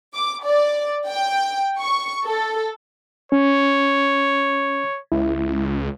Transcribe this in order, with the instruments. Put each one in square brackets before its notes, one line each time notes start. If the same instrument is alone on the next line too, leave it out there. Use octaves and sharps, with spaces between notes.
[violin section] D6
D5
G5
C#6
A4
[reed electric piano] C#4 [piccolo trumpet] C#5
[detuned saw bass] C#2 [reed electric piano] E4